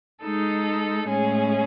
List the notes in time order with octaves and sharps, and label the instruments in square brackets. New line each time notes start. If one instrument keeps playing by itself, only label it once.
[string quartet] G#3 D#4 A4
A2 G#3 C#4 G#4